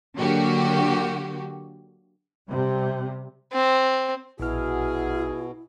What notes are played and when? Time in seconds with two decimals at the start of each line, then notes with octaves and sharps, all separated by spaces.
0.16 D3 F#3 A#3 F#4 G4
2.49 C3 G3
3.52 C4
4.40 A#1 B2 E4 F#4 G#4 F6